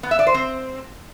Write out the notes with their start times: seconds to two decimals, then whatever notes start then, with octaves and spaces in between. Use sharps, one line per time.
0.03 B3
0.11 E5
0.19 D5
0.27 C5
0.34 C4